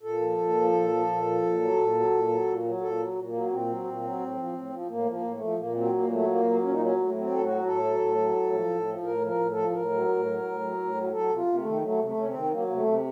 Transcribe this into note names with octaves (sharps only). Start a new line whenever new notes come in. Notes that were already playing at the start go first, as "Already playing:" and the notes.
A#2 A4
F3
A#2
F3
A#2
F3
A#2
F3
A#2
F#3
A#2
F#3
A#2
F#3
A#2
F#3
A#2 A4
F#3
A#2
A#3
F#3
A#2 C4
F#3
A#2
F#3
A2
F3
A2
F3
A2 A#3
F3
A#3
A2
A3
F3
A#2 A#3
F#3 C4
A#2 A#3
F#3 A3
A#2 A#3
F#3
A#2 C#4
D#4
F#3 C#4
A2
F#3
C4
A2 A4
F#4
F#3
A2 A4
F#3
A2
F#3
A2
F3
A2
F3
A2 A#4
F3
A#4
A2
A4
F3
A4
A2 A#4
F#3
A2
F#3
A2
F#3
A2
F#3
F#3 A4
C3
F4
C3
A#3
A3
D#3
F#3 A3
C3
A3
C3 C#4
C4
D#3
F#3 A#3
C3 A#3
A3
C3